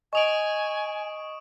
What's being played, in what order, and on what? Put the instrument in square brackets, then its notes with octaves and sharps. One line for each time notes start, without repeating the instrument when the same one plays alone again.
[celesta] D#5 F7 F#7 [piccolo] G#5 [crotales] C#6 D#6 D7